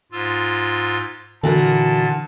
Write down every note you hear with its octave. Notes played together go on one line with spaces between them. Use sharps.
G#2 F4 E6
A#2 D3 E3 F#4 A#4 A5